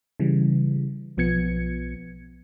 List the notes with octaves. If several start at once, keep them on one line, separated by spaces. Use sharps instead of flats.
C#3 E3 G3
B1 F3 B3 G#6 C#7